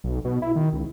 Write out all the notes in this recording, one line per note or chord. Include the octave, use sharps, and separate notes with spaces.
B1
B2
E4
D#3
C#2